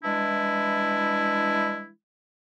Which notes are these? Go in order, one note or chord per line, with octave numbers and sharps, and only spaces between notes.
E3 G3 G#3 D4 E4